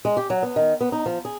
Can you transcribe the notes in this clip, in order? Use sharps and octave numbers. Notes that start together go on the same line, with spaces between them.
G#3
G4
F#3
B3
D#3
B3
D#4
F3
G#4